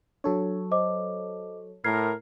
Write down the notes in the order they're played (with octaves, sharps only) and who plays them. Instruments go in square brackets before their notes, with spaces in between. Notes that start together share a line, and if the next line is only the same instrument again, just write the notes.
[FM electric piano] F#3 A4 C#5 [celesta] D4
[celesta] C5 D#5 D6
[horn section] A2 A#4 [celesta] F6 G#6 C7